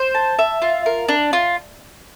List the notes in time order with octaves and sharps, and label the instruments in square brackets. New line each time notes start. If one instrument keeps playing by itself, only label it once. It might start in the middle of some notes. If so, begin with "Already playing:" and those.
Already playing: [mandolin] C5
A5
E5
F4
A#4
D4
F4